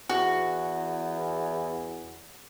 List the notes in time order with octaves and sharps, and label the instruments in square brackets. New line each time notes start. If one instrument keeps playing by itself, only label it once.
[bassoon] E2 [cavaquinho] F#4